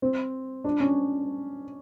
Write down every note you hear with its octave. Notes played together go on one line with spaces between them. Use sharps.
C4
D4
C#4